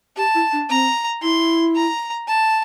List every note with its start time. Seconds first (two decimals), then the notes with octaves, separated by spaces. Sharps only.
0.17 G4 A5
0.34 E4
0.53 D4
0.70 C4 A#5
1.22 E4 C6
1.75 A#5
2.28 A5